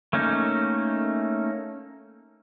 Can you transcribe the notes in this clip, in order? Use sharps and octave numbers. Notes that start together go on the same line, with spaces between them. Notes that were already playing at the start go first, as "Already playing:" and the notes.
A3 A#3 C#4 D#4